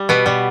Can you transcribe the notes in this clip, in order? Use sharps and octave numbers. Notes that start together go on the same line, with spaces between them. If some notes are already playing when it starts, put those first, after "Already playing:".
Already playing: G3
B2 B3
B2 G3